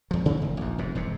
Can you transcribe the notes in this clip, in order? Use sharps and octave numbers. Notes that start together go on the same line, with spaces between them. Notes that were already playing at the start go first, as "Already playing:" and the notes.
E2 F3
C3 D#3 E3 G#3
F1
A#1 D#2
F1 F2 G#2
E1 G2 C3